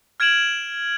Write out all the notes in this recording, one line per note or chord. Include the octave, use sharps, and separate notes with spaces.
F6 G#6 D7 E7 F#7